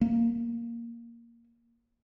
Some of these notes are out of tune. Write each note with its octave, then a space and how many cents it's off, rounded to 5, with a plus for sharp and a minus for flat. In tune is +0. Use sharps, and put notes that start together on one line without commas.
A#3 +0